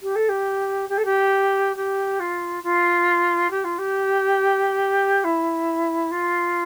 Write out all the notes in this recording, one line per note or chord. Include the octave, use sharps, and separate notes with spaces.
G4
A4
G4
G4
A4
G4
G4
F4
F4
G4
F4
G4
E4
F4